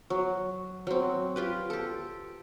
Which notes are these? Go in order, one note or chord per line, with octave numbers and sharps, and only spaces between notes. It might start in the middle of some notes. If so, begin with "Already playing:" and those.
F#3
F#3 C4
F4 G4 B4
G4 A4